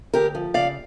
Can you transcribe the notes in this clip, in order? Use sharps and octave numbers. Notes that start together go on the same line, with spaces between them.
D2 G4 A#4
F3
C#3 D5 F5